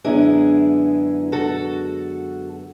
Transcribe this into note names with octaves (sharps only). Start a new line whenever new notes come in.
F#2 D3 G#3 B3 D4 E4 G#4
F#4 A4